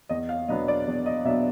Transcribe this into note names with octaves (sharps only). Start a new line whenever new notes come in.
E2 D#5
F5
B2 F#3 B3 D4 D#5
D5
E2
D#5
B2 F#3 B3 D4 E5